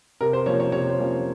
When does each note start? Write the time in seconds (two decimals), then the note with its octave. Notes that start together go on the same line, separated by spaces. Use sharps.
0.21 C3 A#4
0.33 C5
0.46 F3 A#3 C#4 C#5
0.60 C#5
0.72 C3 C#5
0.89 C5
0.99 F3 A#3 C#4